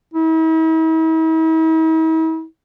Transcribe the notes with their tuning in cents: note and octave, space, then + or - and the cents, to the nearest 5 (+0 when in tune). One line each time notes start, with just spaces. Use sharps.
E4 -45